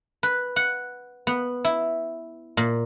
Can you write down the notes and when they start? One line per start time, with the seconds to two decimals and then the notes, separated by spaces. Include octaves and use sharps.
0.23 B4
0.56 F#5
1.27 B3
1.65 E4
2.57 A#2